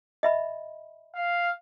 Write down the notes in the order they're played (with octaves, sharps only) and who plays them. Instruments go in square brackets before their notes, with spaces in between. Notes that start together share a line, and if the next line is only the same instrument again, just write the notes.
[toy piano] D#5 E5 B5
[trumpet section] F5